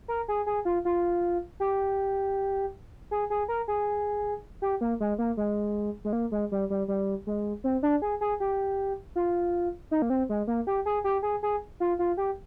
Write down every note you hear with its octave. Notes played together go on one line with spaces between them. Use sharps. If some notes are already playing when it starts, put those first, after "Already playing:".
A#4
G#4
G#4
F4
F4
G4
G#4
G#4
A#4
G#4
G4
A#3
G#3
A#3
G#3
G#3
A#3
G#3
G3
G3
G3
G#3
C4
D4
G#4
G#4
G4
F4
D#4
A#3
C4
G#3
A#3
G4
G#4
G4
G#4
G#4
F4
F4
G4